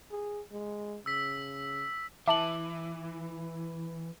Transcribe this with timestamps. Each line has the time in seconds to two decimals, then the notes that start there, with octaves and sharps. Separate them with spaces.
0.11 G#4
0.51 G#3
1.06 C#3 E6 B6
2.28 E3 E5 A5 D6 F#7